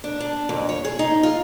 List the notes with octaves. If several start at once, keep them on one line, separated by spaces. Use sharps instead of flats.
D4
D4
F2
C#5
G#4
D#4
F4